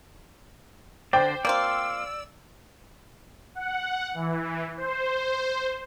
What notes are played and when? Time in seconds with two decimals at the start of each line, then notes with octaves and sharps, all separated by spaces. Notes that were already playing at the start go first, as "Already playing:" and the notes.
1.13 D3 C5 D5 G5 D6
1.45 A#3 C4 F4 D5 E6
3.55 F#5
4.14 E3
4.77 C5